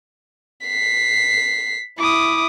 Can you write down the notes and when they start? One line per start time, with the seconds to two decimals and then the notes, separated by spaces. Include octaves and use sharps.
0.67 B6 C7
1.98 E4 D6 D#6